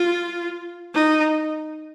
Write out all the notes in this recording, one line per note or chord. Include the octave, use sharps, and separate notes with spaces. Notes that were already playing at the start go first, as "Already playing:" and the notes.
Already playing: F4
D#4